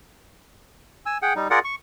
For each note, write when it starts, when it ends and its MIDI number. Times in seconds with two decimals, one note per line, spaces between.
1.06 1.18 80
1.06 1.18 88
1.22 1.33 68
1.22 1.33 78
1.22 1.33 79
1.36 1.48 55
1.36 1.48 63
1.50 1.59 65
1.50 1.59 68
1.50 1.59 70
1.50 1.59 74
1.50 1.59 78
1.64 1.75 85